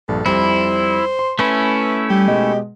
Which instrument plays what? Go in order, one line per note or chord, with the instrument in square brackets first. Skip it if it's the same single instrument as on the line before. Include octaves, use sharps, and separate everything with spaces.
[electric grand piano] A#1 G2 [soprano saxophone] A4
[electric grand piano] F2 G3 [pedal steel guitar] E4 [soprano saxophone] C5
[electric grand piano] C6
[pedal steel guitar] A3 C#4 E4 [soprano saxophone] B4
[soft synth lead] G3 [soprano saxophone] G4
[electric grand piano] B2 G#3 [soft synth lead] D#5